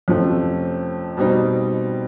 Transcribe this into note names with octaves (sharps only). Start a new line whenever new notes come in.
F2 C3 F3 A3 C#4
B2 G3 C4 D#4